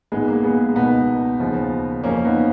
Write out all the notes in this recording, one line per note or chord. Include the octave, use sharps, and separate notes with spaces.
A#1 G#2 D#3 G#3 B3
A#3
G#3 B3
C#2 B2 B3 D#4
D#2 C#3 F3
F1 F2 F3 A#3 C#4
B3 D#4